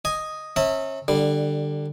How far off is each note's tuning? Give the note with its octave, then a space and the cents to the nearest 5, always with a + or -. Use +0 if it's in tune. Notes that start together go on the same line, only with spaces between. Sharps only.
D#5 +0 G#5 +0
C#4 -30 E5 -30 A#5 -45
D3 +20 G3 +0